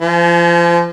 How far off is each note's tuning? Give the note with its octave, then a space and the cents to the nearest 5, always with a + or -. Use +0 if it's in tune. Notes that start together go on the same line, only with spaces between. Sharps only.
F3 -30 G#5 +35